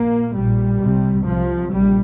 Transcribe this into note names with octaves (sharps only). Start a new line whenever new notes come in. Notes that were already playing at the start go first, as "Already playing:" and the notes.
Already playing: A#1 A#2 A#3
A#1 A#2 G3
C2 C3
C2 C3 F3
A#1 G3